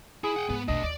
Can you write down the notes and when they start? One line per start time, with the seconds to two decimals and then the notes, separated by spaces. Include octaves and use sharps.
0.24 E4 G#4
0.36 F#5 G5
0.49 G#2 B3
0.68 B1 F2 A3 D4 D#5
0.83 D#2 D5